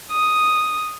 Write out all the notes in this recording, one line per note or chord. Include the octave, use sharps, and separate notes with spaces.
D#6